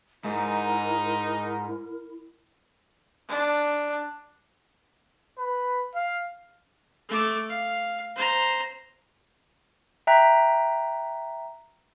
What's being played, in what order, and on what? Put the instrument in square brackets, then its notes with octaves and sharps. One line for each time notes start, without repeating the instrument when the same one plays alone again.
[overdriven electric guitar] G#2 [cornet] D#4 [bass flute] E4 [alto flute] A#4
[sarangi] D4
[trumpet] B4
F5
[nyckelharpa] A3 D6
F5
C5 A#5
[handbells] E5 G5 A#5 F#6 B6